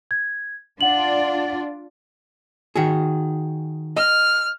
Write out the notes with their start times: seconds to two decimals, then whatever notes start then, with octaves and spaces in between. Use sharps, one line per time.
0.11 G#6
0.81 D4 F4 D5 F#5 F#7
2.76 D#3 F#4 G#4
3.97 D#5 F6